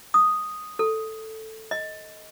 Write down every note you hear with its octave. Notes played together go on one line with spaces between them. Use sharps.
D#6
A4
D#5